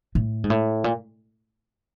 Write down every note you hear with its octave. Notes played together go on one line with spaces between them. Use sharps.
A2
G#2
A2
A#2